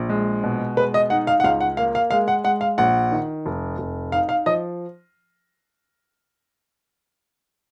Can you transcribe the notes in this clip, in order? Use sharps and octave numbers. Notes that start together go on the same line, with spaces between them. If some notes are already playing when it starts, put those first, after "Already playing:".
Already playing: A#1
G#3
B2
G#3 B4
D#5
D#4 F#5
F5
F#5
C#2 F5
F#5
A#3 F5
F5
G#3 F5
F#5
G#3 F#5
F5
A#1 F#5
D#3
F1
F1
D#4 F5
F5
F3 D#5